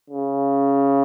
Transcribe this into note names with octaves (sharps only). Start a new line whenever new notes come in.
C#3